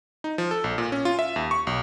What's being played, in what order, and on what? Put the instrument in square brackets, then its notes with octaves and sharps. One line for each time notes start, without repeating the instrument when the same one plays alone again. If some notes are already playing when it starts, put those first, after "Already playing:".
[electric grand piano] D#4
F3
A4
A#1
A#2
C#4
F4
E5
D#2
C#6
B1